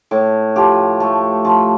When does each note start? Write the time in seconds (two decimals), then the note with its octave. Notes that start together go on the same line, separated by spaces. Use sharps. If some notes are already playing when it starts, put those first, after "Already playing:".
0.11 A2
0.56 F3 G4
1.00 A3
1.45 F3